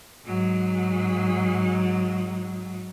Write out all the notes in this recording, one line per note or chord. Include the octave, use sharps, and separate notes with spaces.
G#2 F#3